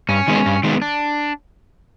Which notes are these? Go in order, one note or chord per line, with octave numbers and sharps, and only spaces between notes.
G2 C#4
D#3 G#3 B3
G2
D#3 G#3 B3
D4